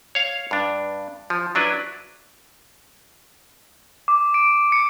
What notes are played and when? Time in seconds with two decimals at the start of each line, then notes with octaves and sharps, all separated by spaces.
0.15 C#5 F5
0.51 G2 D4
1.30 F3
1.55 F#3 D4 E4 B4
4.08 D6
4.34 D7
4.72 C#7